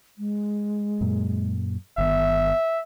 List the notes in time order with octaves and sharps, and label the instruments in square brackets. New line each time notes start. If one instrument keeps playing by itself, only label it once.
[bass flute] G#3
[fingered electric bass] F#2 A#2
[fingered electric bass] G1 D#3 [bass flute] B3 [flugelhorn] E5